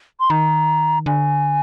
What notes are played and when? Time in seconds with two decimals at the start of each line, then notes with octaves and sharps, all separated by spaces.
0.20 C6
0.30 D#3 A#5
1.06 D3 G#5